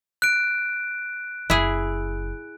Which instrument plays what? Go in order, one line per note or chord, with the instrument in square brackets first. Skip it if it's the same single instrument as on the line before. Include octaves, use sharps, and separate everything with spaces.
[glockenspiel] F#6 D7
[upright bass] F#1 [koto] E4 G#4